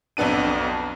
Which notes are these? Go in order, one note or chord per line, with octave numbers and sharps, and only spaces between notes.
B1 F2 B3 D4 D#7